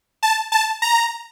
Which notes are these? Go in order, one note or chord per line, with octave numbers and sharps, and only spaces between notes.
A5
A5
A#5